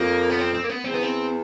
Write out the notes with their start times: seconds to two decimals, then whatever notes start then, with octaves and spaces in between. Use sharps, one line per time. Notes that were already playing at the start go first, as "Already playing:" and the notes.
Already playing: F2 A#3
0.30 B3
0.39 C4
0.54 C4
0.64 A#3
0.69 B3
0.84 E2 C4
0.94 B3
1.03 C4